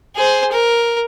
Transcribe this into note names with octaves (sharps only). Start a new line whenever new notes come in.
G#4 C5
A#4